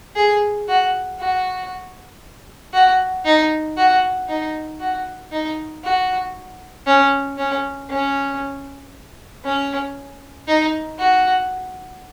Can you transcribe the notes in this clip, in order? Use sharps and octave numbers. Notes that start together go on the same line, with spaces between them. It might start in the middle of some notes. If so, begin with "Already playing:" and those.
G#4
F#4
F#4
F#4
D#4
F#4
D#4
F#4
D#4
F#4
C#4
C#4
C#4
C#4
D#4
F#4